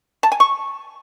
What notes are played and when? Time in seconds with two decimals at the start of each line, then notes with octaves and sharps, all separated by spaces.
0.23 A5
0.32 G#5
0.40 C#6